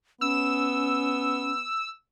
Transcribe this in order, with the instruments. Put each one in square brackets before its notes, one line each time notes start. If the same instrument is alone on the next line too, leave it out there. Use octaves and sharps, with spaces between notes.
[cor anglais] B3 [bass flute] C#4 [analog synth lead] E6